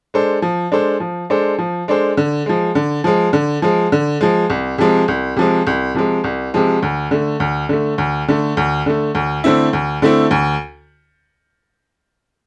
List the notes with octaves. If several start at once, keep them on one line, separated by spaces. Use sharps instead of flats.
G#3 D4 A4 C5
F3
G#3 D4 A4 C5
F3
G#3 D4 A4 C5
F3
G#3 D4 A4 C5
D3
F3 G#3
D3
F3 G#3
D3
F3 G#3
D3
F3 G#3
C2
C3 F3 G#3
C2
C3 F3 G#3
C2
C3 F3 G#3
C2
C3 F3 G#3
D2
D3 A3
D2
D3 A3
D2
D3 A3
D2
D3 A3
D2
D3 A3 C4 E4
D2
D3 A3 C4 E4
D2